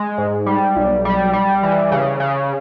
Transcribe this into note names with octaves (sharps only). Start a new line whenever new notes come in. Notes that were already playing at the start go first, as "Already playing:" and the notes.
Already playing: G#3
G#2
G3
B1
G3
G3
E3
C#3
C#3